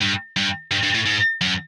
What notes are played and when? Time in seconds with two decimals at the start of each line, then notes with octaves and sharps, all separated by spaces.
0.01 G2
0.36 G2
0.72 G2
0.83 G2
0.95 A2
1.06 G#2
1.41 F#2